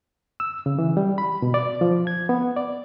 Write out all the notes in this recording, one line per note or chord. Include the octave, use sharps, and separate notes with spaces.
E6
C#3
E3
G3
B5
B2
D5
F3
G#6
B3
D5